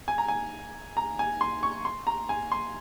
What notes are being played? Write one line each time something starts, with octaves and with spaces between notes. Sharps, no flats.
G#5
A#5
G#5
A#5
G#5
C6
C#6
C6
A#5
G#5
C6